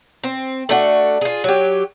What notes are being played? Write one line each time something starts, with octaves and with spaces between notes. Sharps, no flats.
C4
A3 D4 F#4
F4 G#4
F#3 G4